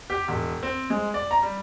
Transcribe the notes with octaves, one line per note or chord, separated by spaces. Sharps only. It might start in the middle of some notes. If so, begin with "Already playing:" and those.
G4
E1
C4
G#3
D5
A#5
G3